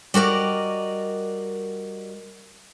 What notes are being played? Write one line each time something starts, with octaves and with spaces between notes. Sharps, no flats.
G3 F#4 A#4 D5 D#5